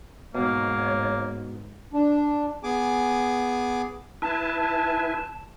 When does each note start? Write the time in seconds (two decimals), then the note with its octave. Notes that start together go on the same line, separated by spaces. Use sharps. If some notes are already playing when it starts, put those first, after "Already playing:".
0.35 G#2 B2 A#3 C#5 A#5
1.93 D4
2.63 B3 G#4 G#5 D6
4.22 E4 B4 G#5 A5